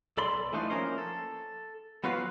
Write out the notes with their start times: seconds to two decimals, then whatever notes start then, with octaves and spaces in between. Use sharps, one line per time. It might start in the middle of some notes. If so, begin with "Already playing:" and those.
0.17 B1 A4 D5 B5 C6
0.53 E3 F3 A3 D4 D#4 F4
0.70 F3 A#3 C#4 A#4 C5
0.98 A4
2.04 F#3 B3 F4 F#4 B4 F5